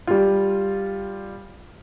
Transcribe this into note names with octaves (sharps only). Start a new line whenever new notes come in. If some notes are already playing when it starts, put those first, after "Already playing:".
G3 F4